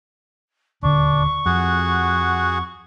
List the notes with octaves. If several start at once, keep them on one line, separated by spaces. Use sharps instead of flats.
D#1 D2 D3 D4 C#6
F2 F#4 G#4 F#5